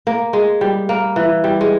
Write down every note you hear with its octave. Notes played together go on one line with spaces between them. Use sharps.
A#3
G#3
G3
A#3
E3
G3
G#3